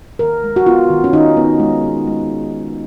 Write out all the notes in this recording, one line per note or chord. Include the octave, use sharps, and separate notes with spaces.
D#3 A#4
G#3
F#4
B3 F4
D#3
C#4
D#3 D#4
B3
G#3
B3
G#3